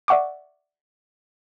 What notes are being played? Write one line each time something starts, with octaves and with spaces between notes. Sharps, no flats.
D5 E5 F#5 C#6 D6